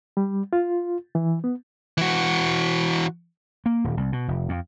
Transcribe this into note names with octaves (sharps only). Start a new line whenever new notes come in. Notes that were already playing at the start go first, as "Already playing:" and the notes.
G3
F4
E3
B3
E3 F#4
A#3
D#1
C2
B2
F1
F2